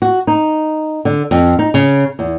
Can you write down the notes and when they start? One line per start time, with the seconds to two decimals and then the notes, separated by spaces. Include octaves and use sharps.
0.02 F#4
0.27 D#4
1.05 D3
1.31 F2
1.59 D#4
1.74 C#3
2.19 E2